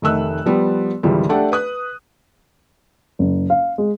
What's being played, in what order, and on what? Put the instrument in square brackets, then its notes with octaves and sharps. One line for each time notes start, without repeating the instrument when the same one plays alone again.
[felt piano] F1 D#3 A3 D#5 E6 F#6
F3 G3 B3
G#1 C#2 E3 F3 G3
A3 D4 G4 A4 D5 F#5
B4 D#6 F#6
[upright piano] F#1
F5
G#3